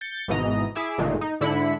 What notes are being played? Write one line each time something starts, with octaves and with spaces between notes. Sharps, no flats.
G6 A6 C#7
G#1 G#2 B2 E3 D#5 A#5
E4 G#4 E5 D6
G1 A#2 D#3 G#3 A3
D#4
G#2 D3 E4 B5 C#7